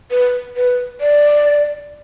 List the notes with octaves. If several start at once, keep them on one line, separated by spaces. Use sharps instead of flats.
B4
B4
D5